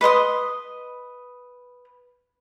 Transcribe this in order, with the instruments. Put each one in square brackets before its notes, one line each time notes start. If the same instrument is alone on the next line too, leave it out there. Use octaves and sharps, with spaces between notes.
[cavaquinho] B4 D#5 C6 D#6